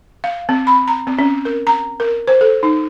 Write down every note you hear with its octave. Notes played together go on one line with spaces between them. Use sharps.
F5
C4
B5
A#5
C4
C#4
A#4
A#5
A#4
C5
A4
D#4